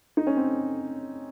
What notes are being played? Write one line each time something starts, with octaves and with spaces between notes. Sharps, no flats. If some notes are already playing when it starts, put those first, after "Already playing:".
D#4
C#4
C4